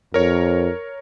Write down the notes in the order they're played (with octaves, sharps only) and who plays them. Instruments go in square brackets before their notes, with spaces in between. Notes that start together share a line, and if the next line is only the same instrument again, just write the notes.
[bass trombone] F2 [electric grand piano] A#4 C#5